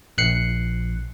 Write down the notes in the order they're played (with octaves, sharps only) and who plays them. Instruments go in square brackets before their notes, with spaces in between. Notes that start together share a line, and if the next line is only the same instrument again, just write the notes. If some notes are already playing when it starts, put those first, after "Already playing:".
[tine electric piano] A#1 F#6 C7 C#7